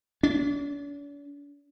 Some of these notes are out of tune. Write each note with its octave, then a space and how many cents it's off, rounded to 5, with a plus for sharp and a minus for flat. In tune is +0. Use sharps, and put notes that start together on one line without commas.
D4 -45